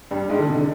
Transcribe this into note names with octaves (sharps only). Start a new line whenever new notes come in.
G2 G3
G#2 G#3
D3
C3
D3